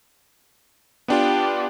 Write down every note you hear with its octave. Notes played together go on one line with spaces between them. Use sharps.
B3 D4 F4 G4